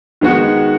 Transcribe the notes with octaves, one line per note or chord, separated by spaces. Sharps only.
D#3 G#3 B3 F#4